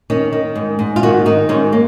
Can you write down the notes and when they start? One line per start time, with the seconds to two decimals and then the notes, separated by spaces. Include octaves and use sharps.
0.10 D#3 C#4
0.33 D#3
0.56 G#2
0.79 G#2
0.96 F4
1.03 D#3 F#4
1.26 D#3 D#4
1.49 G#2 C#4
1.73 A#3